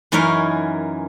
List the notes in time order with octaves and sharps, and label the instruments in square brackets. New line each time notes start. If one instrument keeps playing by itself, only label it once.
[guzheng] F#2 E3 C#4 D#4 A#4 C#5